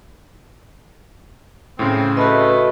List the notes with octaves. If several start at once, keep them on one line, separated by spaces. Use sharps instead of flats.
A2 C#3 C4
A3 F#4 A4 B4 D#5